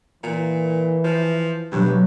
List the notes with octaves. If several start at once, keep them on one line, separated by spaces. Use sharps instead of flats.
A#2 E3
F3
G2 B2 F#3 A3